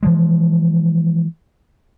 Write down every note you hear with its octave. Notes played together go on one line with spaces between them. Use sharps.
E3 F3 G#3